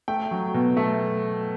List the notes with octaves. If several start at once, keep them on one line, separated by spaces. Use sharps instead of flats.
A3 G5
F#3
B2
A3